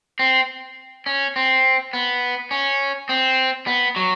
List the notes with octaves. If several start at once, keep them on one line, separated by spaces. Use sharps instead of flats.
C4
C#4
C4
B3
C#4
C4
B3
F#3